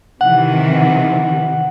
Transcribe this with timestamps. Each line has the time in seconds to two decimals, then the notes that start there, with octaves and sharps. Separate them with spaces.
0.21 C3 D#3 E3 F#5